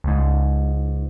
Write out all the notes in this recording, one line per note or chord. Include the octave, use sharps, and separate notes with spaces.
C#2 G#2